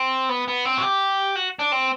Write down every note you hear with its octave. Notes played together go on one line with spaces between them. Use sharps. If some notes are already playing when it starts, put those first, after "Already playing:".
Already playing: C4
B3
B3
C4
F#4
G4
F#4
D4
C4